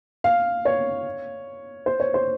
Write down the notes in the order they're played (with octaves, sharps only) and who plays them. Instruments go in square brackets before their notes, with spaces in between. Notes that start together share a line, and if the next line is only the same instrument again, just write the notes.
[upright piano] F5
C#5
C5
C#5
C5